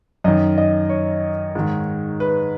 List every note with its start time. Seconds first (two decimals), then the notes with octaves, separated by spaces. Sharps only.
0.24 F#2 D#3 D#5
0.58 D#5
0.89 C#5
1.55 G#2 D#3
2.20 B4